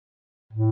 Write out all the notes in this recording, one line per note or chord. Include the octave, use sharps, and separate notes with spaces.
A2